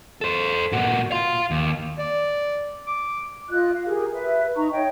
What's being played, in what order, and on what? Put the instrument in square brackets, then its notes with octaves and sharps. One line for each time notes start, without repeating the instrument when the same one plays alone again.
[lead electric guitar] A4 C5
A#2 F#4
F5 C6
D#2
[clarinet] D5
D6
[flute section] F4 D#5 F#6
F5
G4 G#4 A#4
B4 E5
D#4 A#5 C#6
C#5 D#5 G5